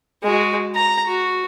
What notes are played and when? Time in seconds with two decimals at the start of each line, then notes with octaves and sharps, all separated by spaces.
0.23 G#3 F#4
0.75 A#5
1.06 F#4